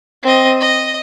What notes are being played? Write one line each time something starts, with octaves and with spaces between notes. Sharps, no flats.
C4 D#5
D#5